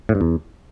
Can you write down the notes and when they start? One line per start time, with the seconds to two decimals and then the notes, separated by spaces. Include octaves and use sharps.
0.09 A2
0.15 G2
0.21 E2